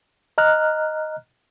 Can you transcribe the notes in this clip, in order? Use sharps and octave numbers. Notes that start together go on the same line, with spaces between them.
D#5 A#5 F6 F#6